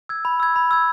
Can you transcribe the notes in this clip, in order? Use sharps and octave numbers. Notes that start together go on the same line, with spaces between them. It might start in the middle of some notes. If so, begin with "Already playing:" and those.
E6 G#6
B5
E6 G#6
B5
E6 G#6